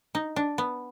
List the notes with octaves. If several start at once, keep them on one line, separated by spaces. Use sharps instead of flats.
D#4
D4
B3